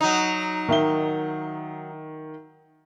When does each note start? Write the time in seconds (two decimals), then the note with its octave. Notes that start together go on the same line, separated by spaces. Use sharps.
0.01 F#3 D#4
0.69 D#3 E5 G7